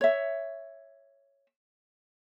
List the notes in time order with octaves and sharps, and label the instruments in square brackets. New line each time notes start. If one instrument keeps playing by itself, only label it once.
[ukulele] C#5 E5